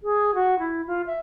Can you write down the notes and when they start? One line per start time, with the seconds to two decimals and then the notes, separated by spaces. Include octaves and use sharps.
0.03 G#4
0.34 F#4
0.58 E4
0.86 F4
1.06 E5